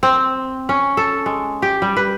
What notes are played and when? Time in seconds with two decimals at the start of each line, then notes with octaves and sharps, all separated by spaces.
0.03 C4
0.69 C#4
0.97 A4
1.26 G#3
1.62 G4
1.82 G3
1.97 B4